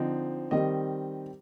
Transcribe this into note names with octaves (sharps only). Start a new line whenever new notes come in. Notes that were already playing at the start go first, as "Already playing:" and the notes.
Already playing: D3 F3 C4 D#4
D#3 G3 C4 D#5